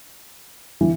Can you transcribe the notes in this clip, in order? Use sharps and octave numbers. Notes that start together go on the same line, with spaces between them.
E3